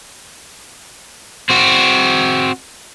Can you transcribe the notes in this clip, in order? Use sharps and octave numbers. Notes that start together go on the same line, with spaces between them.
C4 F#4